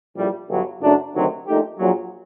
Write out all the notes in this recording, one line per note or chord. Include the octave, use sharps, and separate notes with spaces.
A#1 A2 G3
G1 G2 F#3
F#1 F#2 F#3 A3 D4
D2 C3 D#3 F#3
A#1 A#2 A3 D#4 G4
A#1 A#2 F#3